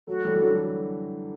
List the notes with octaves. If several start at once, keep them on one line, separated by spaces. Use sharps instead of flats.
F#3 A3 F#4
E3 G3 A4
G3
D3 F#3 F#4